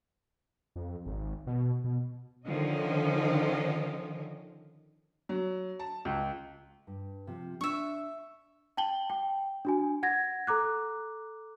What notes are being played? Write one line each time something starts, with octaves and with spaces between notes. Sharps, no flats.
F2
G#1
B2
B2
D3 D#3 F3 C#4 D#5
F#3
A5
C#2
G2
C3 F3
D4 E5 C#6
G5 A5 F#7 G7
G5
D4 F#4 G#5
F#5 G#6 A#6
A4 A#5 D6 F#6